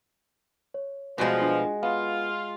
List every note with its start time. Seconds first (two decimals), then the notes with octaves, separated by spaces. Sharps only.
0.74 C#5
1.18 B2 F3 G3 G#3 B3 F#4
1.42 D4 F4
1.83 B3 F4 F5